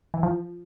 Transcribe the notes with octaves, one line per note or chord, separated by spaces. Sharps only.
E3
F3